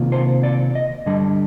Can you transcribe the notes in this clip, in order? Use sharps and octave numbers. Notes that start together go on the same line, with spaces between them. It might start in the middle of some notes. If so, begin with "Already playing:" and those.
Already playing: C3 D#3 A#3 F4
C5
D5
D#5
G2 D3 G3 D#5